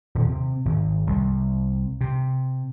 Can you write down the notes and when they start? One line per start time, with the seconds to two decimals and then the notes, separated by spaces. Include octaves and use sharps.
0.15 D#1
0.29 C3
0.65 G#1
1.07 C2
2.01 C3